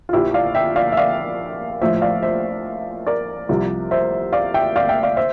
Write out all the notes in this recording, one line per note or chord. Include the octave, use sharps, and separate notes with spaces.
F4
A#1 A#2 F3 E4 G4
D5 F5
E5 G5
D5 F5
E5
D5 F5
A#1 A2 F3 C5 E5
D5 F5
C5 E5
A#4 D5
C2 C3 F3
C5 E5
D5 F5
E5 G5
D5 F5
E5 G5
D5 F5
C5 E5